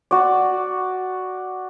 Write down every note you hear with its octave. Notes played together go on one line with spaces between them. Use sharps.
F#4 D5